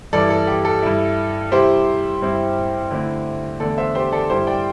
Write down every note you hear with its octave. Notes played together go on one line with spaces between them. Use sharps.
G2 E3 G3 E4 A4 D5
A4
G4
A4
G2 G3 E4
C3 G3 E4 G4 C5
G2 G3 C4 E4
D3 A3 C4 E4
E2 D3 A3 D4 A4 D5
C5 E5
G4 C5
A4 D5
G2 G3 E4 G4 C5
D5 G5